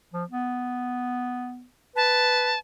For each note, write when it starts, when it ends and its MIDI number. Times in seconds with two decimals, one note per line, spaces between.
0.14 0.24 53
0.30 1.65 59
1.96 2.54 71
1.96 2.59 81